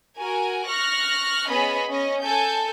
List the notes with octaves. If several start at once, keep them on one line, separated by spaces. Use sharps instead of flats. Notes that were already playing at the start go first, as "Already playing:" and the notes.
F#4 A#4 G#5
C#6 F6 F#6 A#6
B3 C#4 G#4 D#5 B5
C#4 D#5
A4 G#5 G6